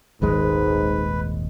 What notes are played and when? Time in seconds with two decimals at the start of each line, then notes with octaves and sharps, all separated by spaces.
0.22 D#1 G#1 G#2 G#3 B4